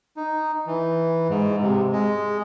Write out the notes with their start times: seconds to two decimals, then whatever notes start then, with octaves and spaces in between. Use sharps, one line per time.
0.16 D#4
0.67 E3
1.30 G#2
1.63 C3
1.93 G#3